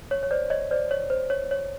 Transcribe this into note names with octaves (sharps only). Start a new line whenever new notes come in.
C#5
C#5
C5 D5
C#5 D#5
C5 D5
C#5
C5
C#5
C#5